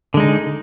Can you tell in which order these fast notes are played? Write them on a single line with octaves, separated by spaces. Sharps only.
D3 G#3 D#4